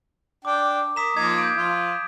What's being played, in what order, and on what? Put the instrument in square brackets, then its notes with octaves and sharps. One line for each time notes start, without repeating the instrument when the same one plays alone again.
[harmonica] D4 G5 [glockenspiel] D6
[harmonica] A#4 [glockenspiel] D#6 B6 E7
[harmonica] F3 A#3 D#4 [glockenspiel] D#6 G#6
[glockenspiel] G6 G#6 D7
[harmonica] F3 F4